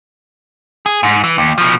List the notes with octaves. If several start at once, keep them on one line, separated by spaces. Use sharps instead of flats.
G#4
G#2
E3
D#2
B2 F3